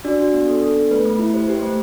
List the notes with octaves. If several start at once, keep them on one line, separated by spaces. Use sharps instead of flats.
D4 F#4 D5
F#4
B3
A4
A4
B3
A3 B4
A3
E4
G4 C5
G4
C5
A3